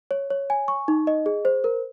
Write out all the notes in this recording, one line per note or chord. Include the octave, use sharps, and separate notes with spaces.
C#5
C#5
G#5
C#6
D#4
D#5
G#4
C5
A#4